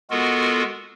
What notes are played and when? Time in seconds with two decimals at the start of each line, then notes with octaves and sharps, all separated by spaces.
0.10 G#3 B3 F4 F#4 A4 A#4